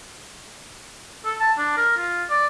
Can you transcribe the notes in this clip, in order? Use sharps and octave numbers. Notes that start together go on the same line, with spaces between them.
A4
A5
D4
A#4
F4
D5